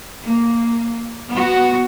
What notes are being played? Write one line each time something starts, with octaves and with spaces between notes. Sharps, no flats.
A#3
B3 F#4